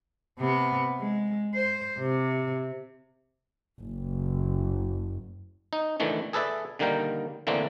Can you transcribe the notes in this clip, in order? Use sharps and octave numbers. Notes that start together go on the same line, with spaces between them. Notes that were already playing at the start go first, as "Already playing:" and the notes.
C3 B3
G#3
C5
C3
F#1
D#4
D#3 E3 A3 D4
G#4 A4 B4 D5 E5
D3 D#3 G3 A#3 A#4 G5
D3 E3 A3 A#3 C4 D4